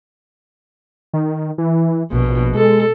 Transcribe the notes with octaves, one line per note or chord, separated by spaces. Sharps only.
D#3
E3
A#1 B2
G#3 A4